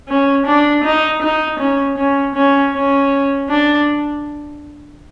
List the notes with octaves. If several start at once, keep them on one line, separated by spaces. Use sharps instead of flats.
C#4
D4
D#4
D#4
C#4
C#4
C#4
C#4
D4